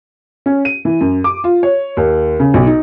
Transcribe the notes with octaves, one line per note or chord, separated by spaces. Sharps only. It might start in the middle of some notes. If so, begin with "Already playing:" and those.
C#4
D#7
E3
F#2
D6
F4
C#5
D#2
C#3
B1
D#4